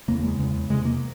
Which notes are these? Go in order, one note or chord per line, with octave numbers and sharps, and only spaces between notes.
E2 C#3 A#3
G#3
E2 C#3
E2 C3 G#3
A#3